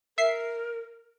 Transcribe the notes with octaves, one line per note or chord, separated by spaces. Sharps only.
A#4 E5 C7